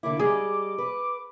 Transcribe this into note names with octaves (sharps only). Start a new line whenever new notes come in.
D3 A#3 E4 D6
G3 G#4 D#5
B4